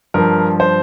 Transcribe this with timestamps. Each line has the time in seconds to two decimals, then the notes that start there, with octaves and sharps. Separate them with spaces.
0.14 G2 F3 A#4
0.60 C5